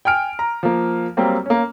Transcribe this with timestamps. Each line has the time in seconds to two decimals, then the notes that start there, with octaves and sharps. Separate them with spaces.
0.05 G5 G#5 F6 D7
0.39 A#5
0.63 F3 A#3
1.17 F#3 G3 A#3 C4
1.46 A#3 C#4